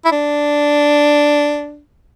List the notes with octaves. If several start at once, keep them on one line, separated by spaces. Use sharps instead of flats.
E4
D4